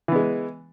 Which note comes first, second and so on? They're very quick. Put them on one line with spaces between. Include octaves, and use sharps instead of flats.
E3 B3 G#3